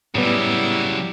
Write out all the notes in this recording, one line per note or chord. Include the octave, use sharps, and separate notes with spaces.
A2 C#3 F#3 G3 B3 E4